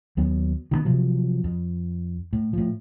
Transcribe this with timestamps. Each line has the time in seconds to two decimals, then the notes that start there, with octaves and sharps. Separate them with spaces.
0.17 D#2 F#3 B3
0.71 D#3 F#3 B3
0.85 C3 F3 F#3
1.44 F2
2.33 A2
2.53 A2 F3